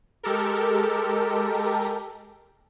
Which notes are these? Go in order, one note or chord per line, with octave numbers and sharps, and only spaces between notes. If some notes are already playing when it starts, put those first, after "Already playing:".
G#3 G4 A4 A#4